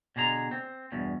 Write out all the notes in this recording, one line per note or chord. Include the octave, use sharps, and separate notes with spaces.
B2 D3 G#4 A#5
C4
E2 G2 B2